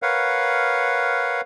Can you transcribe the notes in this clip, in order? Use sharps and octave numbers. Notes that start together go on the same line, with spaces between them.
A#4 B4 C#5 F5 F#5